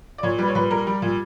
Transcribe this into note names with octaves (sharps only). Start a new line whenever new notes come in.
D5
A#2 C#5
G3 B4
C#5
A#2 B4
G3 A#4
G3
A#2